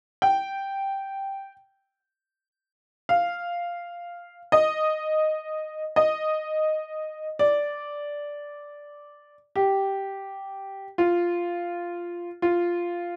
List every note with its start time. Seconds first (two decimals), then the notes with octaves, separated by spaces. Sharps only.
0.22 G5
3.09 F5
4.52 D#5
5.96 D#5
7.39 D5
9.56 G4
10.98 F4
12.42 F4